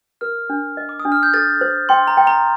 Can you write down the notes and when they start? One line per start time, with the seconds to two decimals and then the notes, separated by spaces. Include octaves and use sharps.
0.21 A#4 F6
0.50 D4
0.77 D#5
0.89 D6
1.00 D#6
1.05 D4
1.12 F6
1.23 G6
1.34 A4 A6
1.61 C5
1.89 G5 C6
2.08 A#5
2.17 G5
2.27 A#5